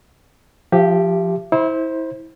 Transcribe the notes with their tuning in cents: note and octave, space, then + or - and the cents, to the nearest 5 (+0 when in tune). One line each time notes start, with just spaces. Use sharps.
F3 +0 G4 +0 E5 +40
E4 -25 C5 +10